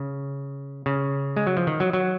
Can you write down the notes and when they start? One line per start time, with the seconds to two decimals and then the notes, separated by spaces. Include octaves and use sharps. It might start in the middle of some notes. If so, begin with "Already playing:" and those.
Already playing: C#3
0.86 C#3
1.36 G#3
1.47 F#3
1.57 F3
1.67 D#3
1.80 F#3
1.93 F#3